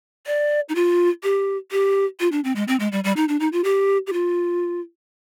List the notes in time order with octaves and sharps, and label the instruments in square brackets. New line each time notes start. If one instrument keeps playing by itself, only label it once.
[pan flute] D5
D#4
F4
G4
G4
F4
D4
C4
G#3
C4
G#3
G3
G3
D#4
D4
D#4
F4
G4
G4
F4